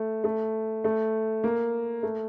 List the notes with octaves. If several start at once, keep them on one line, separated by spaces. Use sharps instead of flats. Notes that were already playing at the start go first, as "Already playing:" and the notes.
Already playing: A3
A3
A3
A#3
A3